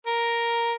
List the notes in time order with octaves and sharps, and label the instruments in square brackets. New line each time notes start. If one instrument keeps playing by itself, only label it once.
[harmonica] A#4